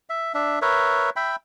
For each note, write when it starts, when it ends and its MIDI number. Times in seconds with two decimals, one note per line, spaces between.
0.10 0.33 76
0.34 0.59 62
0.34 0.59 76
0.62 1.10 70
0.62 1.10 71
0.62 1.10 73
0.62 1.10 76
1.16 1.36 76
1.16 1.36 79
1.16 1.36 83